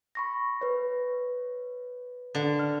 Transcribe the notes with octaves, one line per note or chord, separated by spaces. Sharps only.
B5 C#6 A#6
B4 C#5
D3
F6